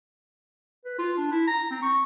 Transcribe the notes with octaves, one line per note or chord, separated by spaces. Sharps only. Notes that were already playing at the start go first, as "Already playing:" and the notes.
B4
F4
D4
E4
A#5
C4
C#6